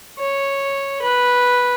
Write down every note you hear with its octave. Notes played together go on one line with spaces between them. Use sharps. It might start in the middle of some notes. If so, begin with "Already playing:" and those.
C#5
B4